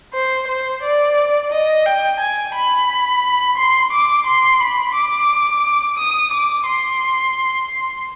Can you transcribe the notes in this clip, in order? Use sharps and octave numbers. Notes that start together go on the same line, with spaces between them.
C5
C5
D5
D#5
G5
G#5
B5
C6
D6
C6
B5
D6
D#6
D6
C6